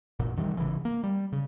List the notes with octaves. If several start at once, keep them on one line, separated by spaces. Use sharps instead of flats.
A1 F#2 A#2
C2 D#3 E3 G3
G#1 C#3 E3
A#3
G3
C#3